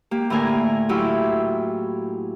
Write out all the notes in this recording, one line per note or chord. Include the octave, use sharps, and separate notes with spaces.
A#3 G4
A2 D3 A#3 A#4 G#5
F#3 E4 F4 G4